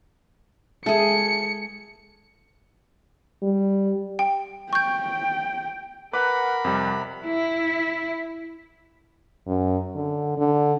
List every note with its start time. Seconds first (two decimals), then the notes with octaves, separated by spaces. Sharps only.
0.86 G#3 G#4 A4 E5 C#7
3.43 G3
4.19 G5
4.73 G5 C#6 G6
6.13 A#4 B4 F#5 B5 D6
6.65 F2 C3 G3
7.24 E4
9.47 F#2
9.95 D3
10.38 D3